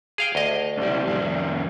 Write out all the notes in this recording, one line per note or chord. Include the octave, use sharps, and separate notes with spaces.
G#4 F5 G5
D2 D#5
B1 G3
F2 G3